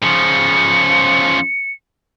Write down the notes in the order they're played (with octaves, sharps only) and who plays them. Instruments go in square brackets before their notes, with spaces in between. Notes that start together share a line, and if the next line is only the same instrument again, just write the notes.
[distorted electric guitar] C#3 F3 [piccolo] C#7